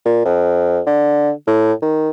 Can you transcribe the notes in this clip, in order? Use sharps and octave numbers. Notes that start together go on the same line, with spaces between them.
A#2
F2
D3
A2
D#3